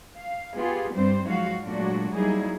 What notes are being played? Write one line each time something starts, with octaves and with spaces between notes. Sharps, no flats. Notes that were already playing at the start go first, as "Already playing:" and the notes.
F5
B3 F4 G4 G#4
G2 G3 C4 C5
G#2 F3 F#3 F#4 F5
A#2 F#3 G#3 A3 D4 F#4
F#3 G3 A#3 D#4 E4 G#4